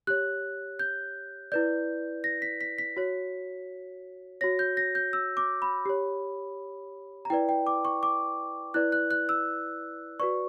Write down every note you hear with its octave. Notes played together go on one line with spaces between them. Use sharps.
G4 C#5 F#6
G6
E4 B4 D5 G6
A#6
B6
B6
B6
F#4 C#5
F#4 C#5 A#6
G6
A#6
G6
E6
D6
B5
G4 C#5
A#5
E4 B4 D5 G5
G5
D6
C#6
D6
E4 B4 D5 F#6
F#6
F#6
E6
F#4 B4 D5 C#6